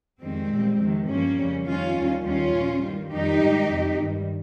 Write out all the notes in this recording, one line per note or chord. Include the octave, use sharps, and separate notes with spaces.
F2 D#3 G3 G#3 C4
A#2 G3
F2 C3 D#3
G2 F3 A#3 C#4
F2 C#3 G3
F2 D#3 G3 C#4 F4
D#2 D#3 G3
D#2 D#3 G3 C#4 F4
A#2 F3
G2 D#3 G3
F2 D#3 G3 D#4 G4
G#2 D#3 G3
F2 C3 G3
G2 D#3 G3